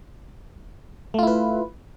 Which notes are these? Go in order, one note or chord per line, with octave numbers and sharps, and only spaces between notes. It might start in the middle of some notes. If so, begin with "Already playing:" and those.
A3 E4 F4 B4